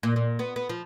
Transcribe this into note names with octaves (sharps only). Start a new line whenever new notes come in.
A#2
A#2
B3
B3
F3